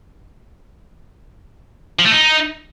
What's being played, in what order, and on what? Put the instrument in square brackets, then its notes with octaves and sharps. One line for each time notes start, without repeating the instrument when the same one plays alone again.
[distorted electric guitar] F3
A3
D#4